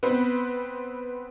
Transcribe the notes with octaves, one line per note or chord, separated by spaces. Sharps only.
B3 C4 B4